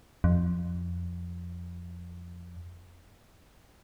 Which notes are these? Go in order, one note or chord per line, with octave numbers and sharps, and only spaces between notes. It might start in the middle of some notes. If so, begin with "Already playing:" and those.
F2